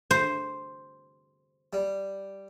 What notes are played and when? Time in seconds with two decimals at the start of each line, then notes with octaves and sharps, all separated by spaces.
0.11 C5
1.73 G3